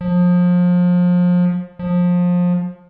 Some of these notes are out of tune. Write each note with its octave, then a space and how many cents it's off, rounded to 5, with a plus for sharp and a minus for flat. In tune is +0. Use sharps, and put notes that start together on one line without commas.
F3 +30
F3 +25